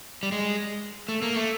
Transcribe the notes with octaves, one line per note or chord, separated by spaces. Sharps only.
G3
G#3
A3
A#3
A3